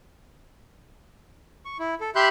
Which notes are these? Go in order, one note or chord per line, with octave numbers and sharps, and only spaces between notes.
C#6
E4
A4
G4 E5 B5 C6 F#6 G6